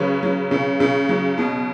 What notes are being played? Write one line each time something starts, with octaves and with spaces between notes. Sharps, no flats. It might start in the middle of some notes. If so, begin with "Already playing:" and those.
Already playing: C#3 F#3 B4 C#5
F#3
C#3
C#3
F#3
B2